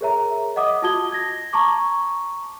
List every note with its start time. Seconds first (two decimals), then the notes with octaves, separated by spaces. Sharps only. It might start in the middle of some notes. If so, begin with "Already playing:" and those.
0.01 G#4 A#4 C#5 E5 A#5
0.56 D#5 F#5 D6 D#6
0.82 F4 F#4 A5 D#6 G#6 G7
1.12 G#6 A#6
1.53 A5 A#5 C#6 D6